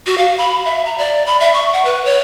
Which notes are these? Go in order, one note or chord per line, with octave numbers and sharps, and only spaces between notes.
F#4
F5
B5
E5
A#5
D5
B5
E5
C#6
F#5
B4
C#5